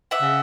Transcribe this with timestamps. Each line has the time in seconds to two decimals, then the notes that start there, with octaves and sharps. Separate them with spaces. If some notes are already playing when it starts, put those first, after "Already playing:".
0.11 E5 F#5
0.21 C#3